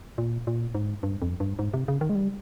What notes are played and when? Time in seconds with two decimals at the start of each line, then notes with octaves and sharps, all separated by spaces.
0.18 A#2
0.47 A#2
0.75 G#2
1.03 G2
1.22 F2
1.40 G2
1.59 G#2
1.74 C3
1.88 C#3
2.01 D#3
2.10 G#3
2.15 G3